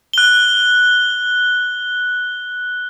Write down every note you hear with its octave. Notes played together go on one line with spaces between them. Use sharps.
F#6 G7